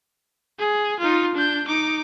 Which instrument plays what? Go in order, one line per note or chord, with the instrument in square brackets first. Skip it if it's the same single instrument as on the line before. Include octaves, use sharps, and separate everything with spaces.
[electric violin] G#4
D#4 F4
D4 G6
D#4 D6